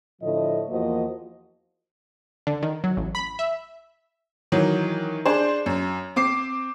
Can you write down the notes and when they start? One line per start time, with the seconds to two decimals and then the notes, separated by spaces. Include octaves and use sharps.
0.22 A2 D3 F3 A3 D#5
0.70 E2 F3 A#3 F#4 C5 D#5
2.47 D3
2.63 D#3
2.84 F#3
2.97 A1
3.15 B5
3.39 E5
4.52 D#3 E3 F#3
5.26 D4 G#4 C5
5.66 F#2
6.16 C4 D6 C7